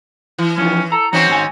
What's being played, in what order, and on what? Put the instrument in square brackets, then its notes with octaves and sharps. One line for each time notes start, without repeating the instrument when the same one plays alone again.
[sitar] E3
[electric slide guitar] F3 D#4 [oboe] C#4
[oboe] A4 [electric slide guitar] A#5
[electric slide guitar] E3 [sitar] C4 C#4 D#4 [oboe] F#4
[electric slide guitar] G#2 D#3 G#5